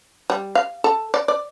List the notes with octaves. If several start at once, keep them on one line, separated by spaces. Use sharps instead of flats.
G3
F5
A4
D5
D5